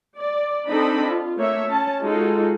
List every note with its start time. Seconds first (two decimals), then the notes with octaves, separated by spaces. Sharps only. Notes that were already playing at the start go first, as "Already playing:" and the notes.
0.18 D5
0.69 C4 D4 D#4 A4 D#5 B5
1.08 F4
1.37 A3 A#3 C#5 E5
1.70 C#4 A5
2.03 G#3 D#4 F4 F#4 G#4 A4